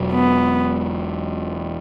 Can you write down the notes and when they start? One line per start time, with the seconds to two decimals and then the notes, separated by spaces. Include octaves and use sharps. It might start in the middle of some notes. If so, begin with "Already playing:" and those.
Already playing: E1 E2 B2 F#3
0.13 B3